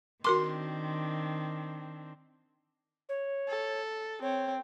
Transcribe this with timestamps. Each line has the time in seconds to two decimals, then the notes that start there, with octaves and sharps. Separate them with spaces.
0.24 D#3 C4 D4 F#4 A#4 C6 D6
3.09 C#5
3.48 A4
4.22 C4 C#5